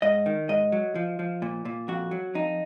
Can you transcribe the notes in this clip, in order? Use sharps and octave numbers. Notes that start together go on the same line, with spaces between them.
G#2 D#5
D#3
G#2 D#5
F#3
F3
F3
A#2
A#2
F2 F#4
F#3
F2 D#4